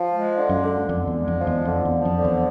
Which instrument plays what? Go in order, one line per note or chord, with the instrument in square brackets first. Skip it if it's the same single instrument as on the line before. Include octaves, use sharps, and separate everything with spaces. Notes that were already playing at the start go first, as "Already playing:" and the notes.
Already playing: [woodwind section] F3
G#3
D3
[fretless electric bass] F#2
[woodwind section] D3
[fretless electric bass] F2 [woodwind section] D3
[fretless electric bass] E2
[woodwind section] G#3
[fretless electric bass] F2
[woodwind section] F3
[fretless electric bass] E2
[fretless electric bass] F2 [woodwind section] D3
[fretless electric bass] E2
[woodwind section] F3
[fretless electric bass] F2
[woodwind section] D3
[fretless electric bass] E2